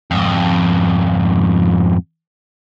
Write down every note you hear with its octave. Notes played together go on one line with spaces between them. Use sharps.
F2 G#2